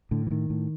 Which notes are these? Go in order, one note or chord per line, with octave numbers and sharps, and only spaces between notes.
A2 D3
E3
A2 D#3
A2